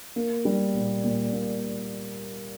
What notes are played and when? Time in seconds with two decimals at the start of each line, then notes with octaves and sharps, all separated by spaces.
0.16 A#3
0.45 G3
0.74 A#2
1.04 A#2
1.33 A#3